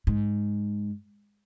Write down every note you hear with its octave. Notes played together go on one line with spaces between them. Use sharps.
G#2